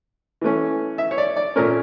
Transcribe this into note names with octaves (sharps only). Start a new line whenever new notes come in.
E3 A3 C#4
E5
C#5
D5
D5
A#2 A3 C#4 A#4